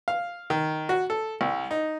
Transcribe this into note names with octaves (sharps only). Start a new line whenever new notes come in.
F5
D#3
F#4
A4
C2
D#4